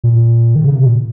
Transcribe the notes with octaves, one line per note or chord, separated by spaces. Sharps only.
A#2
D#3
C#3
C3
A#2